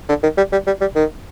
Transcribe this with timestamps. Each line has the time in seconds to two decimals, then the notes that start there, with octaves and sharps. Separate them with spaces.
0.09 D3
0.23 D#3
0.37 G3
0.52 G3
0.67 G3
0.81 G3
0.95 D#3